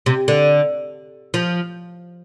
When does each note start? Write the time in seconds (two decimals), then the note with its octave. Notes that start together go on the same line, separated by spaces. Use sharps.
0.06 C3
0.28 D3
1.34 F3